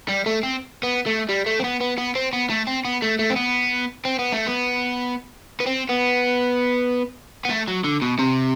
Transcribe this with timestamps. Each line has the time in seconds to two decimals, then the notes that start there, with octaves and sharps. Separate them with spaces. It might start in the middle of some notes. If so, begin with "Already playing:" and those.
0.09 G3
0.26 A3
0.43 C4
0.83 B3
1.06 A3
1.29 G3
1.46 A3
1.59 C4
1.64 B3
1.81 B3
1.98 B3
2.16 C4
2.33 B3
2.50 A3
2.67 C4
2.85 B3
3.02 A3
3.19 A3
3.30 C4
3.36 B3
4.05 C4
4.19 B3
4.33 A3
4.47 B3
5.60 B3
5.66 C4
5.89 B3
7.45 B3
7.50 A3
7.68 F#3
7.84 D3
8.02 B2
8.19 C3